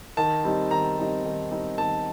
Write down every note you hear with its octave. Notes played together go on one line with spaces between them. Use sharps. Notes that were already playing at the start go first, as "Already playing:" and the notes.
D#3 A5
G3 C4 D#4
D#3 A#5
G3 C4 D#4
D#3
G3 C4 D#4
D#3 A5